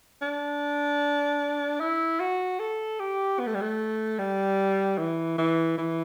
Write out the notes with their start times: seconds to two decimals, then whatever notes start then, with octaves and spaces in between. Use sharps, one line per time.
0.22 D4
1.80 E4
2.20 F#4
2.60 A4
3.00 G4
3.39 B3
3.47 A3
3.54 G3
3.61 A3
4.19 G3
4.98 E3
5.38 E3
5.78 E3